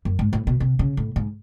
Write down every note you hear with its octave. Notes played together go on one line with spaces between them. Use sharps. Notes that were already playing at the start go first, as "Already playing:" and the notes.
F#2
G#2
A2
B2
C3
C#3
A2
G#2